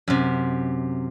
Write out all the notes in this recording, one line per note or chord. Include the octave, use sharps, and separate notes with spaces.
F#2 C3